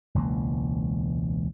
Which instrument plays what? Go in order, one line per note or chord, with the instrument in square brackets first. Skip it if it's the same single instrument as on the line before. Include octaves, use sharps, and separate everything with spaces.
[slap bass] E1 C#2 E3 A#3